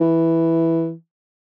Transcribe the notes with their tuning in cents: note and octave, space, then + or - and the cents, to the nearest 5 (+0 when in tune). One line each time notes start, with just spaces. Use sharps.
E3 +0